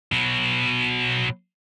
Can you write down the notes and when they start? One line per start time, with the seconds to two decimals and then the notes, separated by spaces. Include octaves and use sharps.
0.12 B2 F#3